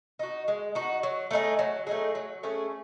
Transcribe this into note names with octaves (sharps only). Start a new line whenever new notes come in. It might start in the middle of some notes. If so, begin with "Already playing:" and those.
D#4 F#4
G#3
D#4 F#4
F#3
A3 D#4 G#4
F#3
A3 D#4 G#4
F#3
A3 C#4 G#4